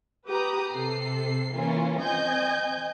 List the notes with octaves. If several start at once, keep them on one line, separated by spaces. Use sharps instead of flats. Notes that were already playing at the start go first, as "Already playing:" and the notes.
G4 B4 A#5 D#6
C3 A4 C7
E3 A#3 C#4 F4
C4 D#5 G#5 G6